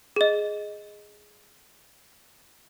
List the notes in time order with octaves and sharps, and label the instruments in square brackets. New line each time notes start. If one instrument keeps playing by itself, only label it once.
[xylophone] G#4 D#5